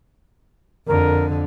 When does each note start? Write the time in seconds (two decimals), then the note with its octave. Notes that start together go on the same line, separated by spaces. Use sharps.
0.87 F2 D3 A#4